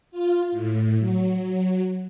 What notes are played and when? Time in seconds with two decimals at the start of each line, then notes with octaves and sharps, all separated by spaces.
0.11 F4
0.52 A2
0.99 F#3